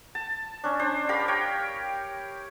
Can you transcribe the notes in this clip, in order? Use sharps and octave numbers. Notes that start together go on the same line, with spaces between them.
A5
C#4 D4
D4 C5
G4 A#4 F5 B5
C#5 G5